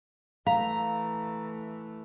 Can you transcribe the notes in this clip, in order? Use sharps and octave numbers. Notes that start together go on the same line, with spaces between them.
E3 A3 F5 A#5